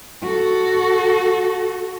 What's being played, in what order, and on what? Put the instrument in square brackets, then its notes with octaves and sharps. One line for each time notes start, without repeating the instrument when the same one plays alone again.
[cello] F#4 A4